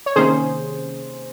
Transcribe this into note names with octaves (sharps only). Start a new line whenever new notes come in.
C#5
C3 D#3 A#3 C#4 G#4 C5